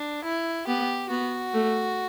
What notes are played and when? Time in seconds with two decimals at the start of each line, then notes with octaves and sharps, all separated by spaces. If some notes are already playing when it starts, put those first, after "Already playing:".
Already playing: D4
0.24 E4
0.67 B3 G4
1.10 B3 F#4
1.54 A3